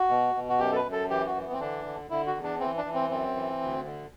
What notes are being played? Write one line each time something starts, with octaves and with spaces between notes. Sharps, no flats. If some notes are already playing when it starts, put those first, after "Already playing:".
Already playing: F#4
B2
B2
F#4
F#2 G4
A4
B4
F#2
A4
E3 G4
F#4
E3
B3
C4
D3 D4
D3
D3 E4
F#4
E2
D4
E3 C4
D4
E3
C4
F#2 C4
E3
D2
D3